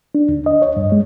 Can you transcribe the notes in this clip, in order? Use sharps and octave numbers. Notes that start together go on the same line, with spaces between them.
D4
D2
D#5
C#5
G2
G#3